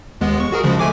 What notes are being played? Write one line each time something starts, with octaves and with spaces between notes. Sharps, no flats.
D#2 G#3 B3
C#6
F#4 G#4 A#4
C#3 F3 G#3
A3 G#5 D6